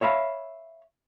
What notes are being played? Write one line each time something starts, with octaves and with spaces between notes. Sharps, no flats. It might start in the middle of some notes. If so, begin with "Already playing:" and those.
C#5 E5 F5 B5